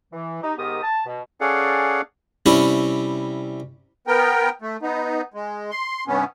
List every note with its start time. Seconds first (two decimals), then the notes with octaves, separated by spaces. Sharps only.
0.13 E3
0.42 D#4 G4
0.57 G#2 D#3 B3 G4 A#4 D#6
0.83 A5
1.06 B2
1.41 C#4 G#4 A4 D5 F5 F#5
2.46 C3 G3 C#4 E4 C#6
4.07 B3 A#4 G5
4.62 A3
4.82 B3 D#4
5.34 G#3
5.71 C6
6.08 G2 C3 B3 C#4